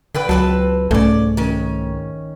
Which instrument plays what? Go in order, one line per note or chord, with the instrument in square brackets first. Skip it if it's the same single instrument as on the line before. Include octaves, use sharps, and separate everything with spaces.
[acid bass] D3 [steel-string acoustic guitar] B4 D5 G5
[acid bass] C#2 [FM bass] F#3 [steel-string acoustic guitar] C4 B4 A5
[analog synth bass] C2 [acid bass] G#2 [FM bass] A3 [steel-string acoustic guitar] C#4 D5
[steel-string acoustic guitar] D#3 C#4